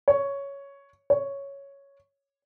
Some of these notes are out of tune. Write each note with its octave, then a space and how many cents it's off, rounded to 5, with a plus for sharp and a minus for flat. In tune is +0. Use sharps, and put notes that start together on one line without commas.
C#5 +5
C#5 +0